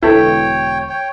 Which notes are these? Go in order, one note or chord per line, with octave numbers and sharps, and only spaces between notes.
E1 D3 E4 A4 B4 C#5 G5
C#5 G5